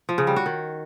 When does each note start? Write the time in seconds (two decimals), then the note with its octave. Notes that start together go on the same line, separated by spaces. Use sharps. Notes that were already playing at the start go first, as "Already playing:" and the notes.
0.09 F3
0.18 C#3
0.27 G3
0.36 F#4
0.46 D#3